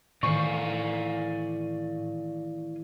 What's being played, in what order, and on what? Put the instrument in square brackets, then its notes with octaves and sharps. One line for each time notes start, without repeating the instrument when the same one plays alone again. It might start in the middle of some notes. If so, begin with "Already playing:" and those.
[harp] A1 D#3 C5 [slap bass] A2 [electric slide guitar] D5 F5 G#5 [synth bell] C#6